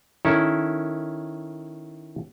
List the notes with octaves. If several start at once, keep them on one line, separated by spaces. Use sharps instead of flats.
D#3 C#4 E4 A4